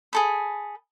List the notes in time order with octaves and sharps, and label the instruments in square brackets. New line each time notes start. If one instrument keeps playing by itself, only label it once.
[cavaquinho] G#4 A4 B5